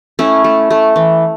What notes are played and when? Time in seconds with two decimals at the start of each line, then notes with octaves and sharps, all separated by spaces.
0.19 A3 C#4 E4
0.44 A3
0.71 A3
0.96 E3